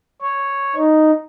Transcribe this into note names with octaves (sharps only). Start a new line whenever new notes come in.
C#5
D#4